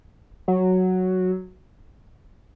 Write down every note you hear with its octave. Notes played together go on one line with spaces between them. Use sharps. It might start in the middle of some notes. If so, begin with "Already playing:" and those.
F#3